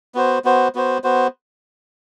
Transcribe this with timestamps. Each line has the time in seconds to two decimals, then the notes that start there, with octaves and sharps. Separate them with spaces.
0.15 B3 F#4 C5
0.44 B3 F#4 C5
0.75 B3 F#4 C5
1.04 B3 F#4 C5